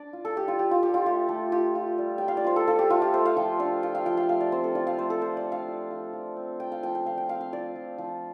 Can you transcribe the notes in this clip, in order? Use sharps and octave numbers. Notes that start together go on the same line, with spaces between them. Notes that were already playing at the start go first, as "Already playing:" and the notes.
Already playing: D4 D5
F4
A4
G3 G4
F4
F4 G4
F4
F4 G4
F4
A3 G4
A3 A4
F4 G4
F4
G3
G3 G5
F5
D5
F4 C5
A4
F4 A4
G4
A3 F4
G4
A3 C5
F5
F3 G5
D4 F5
F4 G5
F5
F3 G5
F5
A3 F5
D5
C4 C5
A4
F4 D5
F5
A3 C5
A4
F3 C5
D5
D4
F5
F4
F3
F3
C4
F4 G5
F5
F3 G5
G5
F3 F5
G5
C4 F5
F5
F4 D5
F3
F3